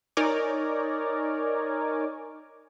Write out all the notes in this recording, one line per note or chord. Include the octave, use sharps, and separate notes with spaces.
D#4 A#4 C#5 D5 G#5 D6